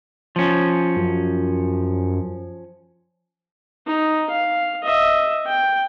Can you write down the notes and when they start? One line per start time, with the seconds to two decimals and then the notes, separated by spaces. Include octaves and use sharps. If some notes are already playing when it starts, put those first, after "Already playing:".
0.36 F3 C#4
0.96 F#2
3.87 D#4
4.30 F5
4.83 D#5 E5
5.46 G5